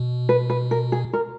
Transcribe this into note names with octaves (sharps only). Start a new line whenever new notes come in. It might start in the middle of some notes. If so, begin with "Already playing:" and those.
Already playing: B2
B4
B4
A#4
G#4
A#4